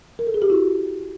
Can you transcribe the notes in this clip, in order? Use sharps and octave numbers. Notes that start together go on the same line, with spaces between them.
A#4
A4
G#4
G4
E4 F#4